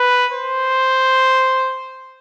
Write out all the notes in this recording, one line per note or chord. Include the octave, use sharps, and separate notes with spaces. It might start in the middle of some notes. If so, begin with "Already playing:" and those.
Already playing: B4
C5